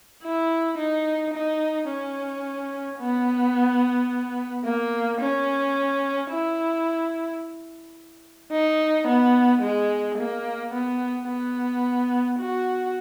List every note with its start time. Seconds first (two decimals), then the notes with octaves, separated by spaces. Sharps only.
0.23 E4
0.78 D#4
1.34 D#4
1.89 C#4
3.00 B3
4.65 A#3
5.20 C#4
6.31 E4
8.52 D#4
9.07 B3
9.62 G#3
10.18 A#3
10.73 B3
11.28 B3
12.39 F#4